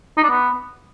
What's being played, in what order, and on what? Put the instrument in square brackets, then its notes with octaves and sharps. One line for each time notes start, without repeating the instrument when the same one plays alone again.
[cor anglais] D#4
D4
B3